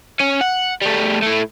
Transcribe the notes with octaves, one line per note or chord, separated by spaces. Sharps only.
C#4
F#5
G3 A3
A2 A3